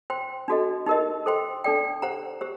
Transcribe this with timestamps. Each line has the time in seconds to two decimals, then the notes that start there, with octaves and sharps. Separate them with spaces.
0.10 C5 G5 C6
0.48 D4 F#4 A4 D#5
0.86 D#4 G4 A#4 D#5
1.26 A4 C5 G5 C6
1.64 D4 A4 D5 G5
2.02 G4 C5 F#5 A#5
2.41 G4 C5